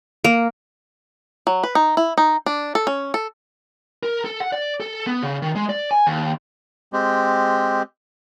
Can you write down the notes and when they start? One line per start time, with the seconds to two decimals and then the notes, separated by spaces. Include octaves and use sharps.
0.24 A#3
1.47 F#3
1.64 B4
1.75 D#4
1.97 E4
2.18 D#4
2.46 D4
2.75 A4
2.87 C#4
3.14 A4
4.03 A#4
4.25 A4
4.40 F#5
4.52 D5
4.80 A4
5.07 B3
5.23 C#3
5.42 D#3
5.55 G#3
5.69 D5
5.91 G#5
6.07 D#2
6.93 G#3 C4 G4